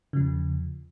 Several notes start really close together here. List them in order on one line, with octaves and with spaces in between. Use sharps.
C#3 F3 E2